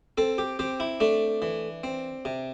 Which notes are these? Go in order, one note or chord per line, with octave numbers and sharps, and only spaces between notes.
C4 A4
G4
C4 G4
E4
A3 D4
E3
C4
C3